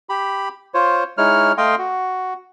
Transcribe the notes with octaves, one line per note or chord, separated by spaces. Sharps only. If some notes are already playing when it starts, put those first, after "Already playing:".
G4 B5
F4 C5 C#5
G#3 D#4 E4 C#5 F6
A3 D#5 F5 G5 C6
F#4